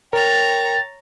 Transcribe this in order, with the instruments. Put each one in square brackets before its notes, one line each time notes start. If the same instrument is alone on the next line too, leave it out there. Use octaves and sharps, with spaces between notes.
[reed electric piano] A#4 [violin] C#5 A#5 [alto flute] G5 [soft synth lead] A6